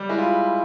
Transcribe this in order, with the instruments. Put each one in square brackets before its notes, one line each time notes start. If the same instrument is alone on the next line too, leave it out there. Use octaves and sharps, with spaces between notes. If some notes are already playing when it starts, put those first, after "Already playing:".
Already playing: [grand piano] G3
G#3 E4
F4